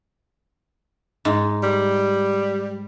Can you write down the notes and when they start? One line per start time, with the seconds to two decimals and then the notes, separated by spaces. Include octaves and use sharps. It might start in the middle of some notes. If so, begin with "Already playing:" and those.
1.25 G#2 D#4
1.63 G3